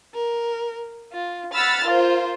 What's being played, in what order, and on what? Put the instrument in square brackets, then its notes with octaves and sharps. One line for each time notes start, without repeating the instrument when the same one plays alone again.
[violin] A#4
F4
[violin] F#5 F6 [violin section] B5 E6 A6
[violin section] F4 C5 [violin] A#4